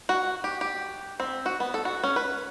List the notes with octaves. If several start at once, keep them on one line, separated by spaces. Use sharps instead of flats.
F#4
G4
G4
C4
F#4
B3
A4
F#4
C#4
B4